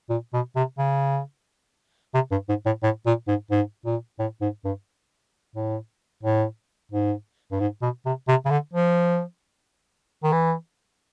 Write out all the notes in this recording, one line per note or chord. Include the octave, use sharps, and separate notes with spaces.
A#2
B2
C3
C#3
C3
G2
G#2
A2
A2
A#2
G#2
G#2
A#2
A2
G#2
G2
A2
A2
G#2
G2
G#2
B2
C3
C3
C#3
D3
F3
D#3
E3